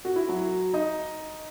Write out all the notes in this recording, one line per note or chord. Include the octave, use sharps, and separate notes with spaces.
F#4
E4
F#3 F#4
D#4 D#5